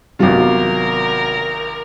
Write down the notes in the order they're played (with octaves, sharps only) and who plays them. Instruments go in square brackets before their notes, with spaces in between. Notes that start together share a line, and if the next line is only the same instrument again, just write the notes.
[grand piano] G#1 F4 [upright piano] C3 F#3 B3 [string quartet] A#4